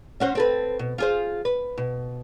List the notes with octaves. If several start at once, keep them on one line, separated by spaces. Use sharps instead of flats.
C#4 F#4 C5
C4 A4 B4
B2
F4 G#4 C5
B4
B2